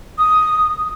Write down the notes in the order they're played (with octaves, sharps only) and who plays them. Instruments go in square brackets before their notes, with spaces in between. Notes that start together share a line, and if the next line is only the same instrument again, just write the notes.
[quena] D#6